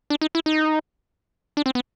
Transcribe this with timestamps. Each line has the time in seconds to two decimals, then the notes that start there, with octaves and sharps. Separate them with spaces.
0.10 D4
0.21 D#4
0.35 E4
0.46 D#4
1.57 D4
1.66 C4
1.75 B3